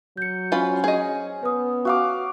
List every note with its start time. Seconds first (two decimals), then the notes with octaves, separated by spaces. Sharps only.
0.17 F#3 G6 C#7
0.52 C#4 F4 C5 B5
0.84 G#4 D#5
1.43 B3 B4 D#6
1.85 F#4 F5 D6